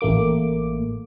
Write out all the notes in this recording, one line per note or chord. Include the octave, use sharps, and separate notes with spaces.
A1 A3 A#3 D6